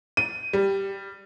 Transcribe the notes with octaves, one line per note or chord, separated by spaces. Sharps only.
D#7
G3